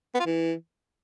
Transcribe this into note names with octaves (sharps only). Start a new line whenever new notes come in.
B3
F4
E3